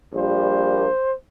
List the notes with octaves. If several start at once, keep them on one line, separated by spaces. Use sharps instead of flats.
A#1 A#2 G3 A#3 C5